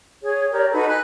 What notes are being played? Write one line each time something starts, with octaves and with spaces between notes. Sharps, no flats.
G#4 C#5
G4 A#4 C#5 D5
D#4 F#4 A4 B4
G#5 B5 F#6